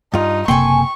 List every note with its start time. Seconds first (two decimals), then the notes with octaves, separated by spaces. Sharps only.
0.14 G2 D#4 F4
0.48 F#1 C3 A#3 A4 G5 G#5 C6 C#6